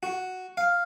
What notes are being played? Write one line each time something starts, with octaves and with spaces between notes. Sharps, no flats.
F#4
F5